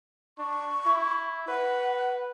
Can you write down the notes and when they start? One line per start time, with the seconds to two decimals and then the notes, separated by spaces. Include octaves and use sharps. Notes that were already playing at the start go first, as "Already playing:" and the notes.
0.38 D4 C#6
0.86 E4
1.48 B4 F#5